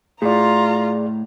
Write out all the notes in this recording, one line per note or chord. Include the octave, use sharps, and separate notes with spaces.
A2 F4 G#4 D5 A#5